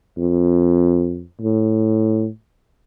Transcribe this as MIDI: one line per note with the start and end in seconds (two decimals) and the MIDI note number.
0.18 1.24 41
1.41 2.28 45